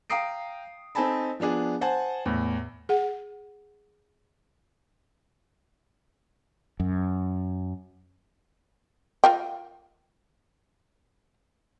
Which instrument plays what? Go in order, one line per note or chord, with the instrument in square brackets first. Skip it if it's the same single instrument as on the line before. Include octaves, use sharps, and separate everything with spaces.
[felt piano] F5 G5 A#5 D#6 C7 D7
C4 D#4 A4 G#5 A5 B5
F3 B3 D4 G#4
C5 F#5 G#5 A5
E2 A2
[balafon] G#4 F#5
[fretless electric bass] F#2
[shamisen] F4 A#4 G5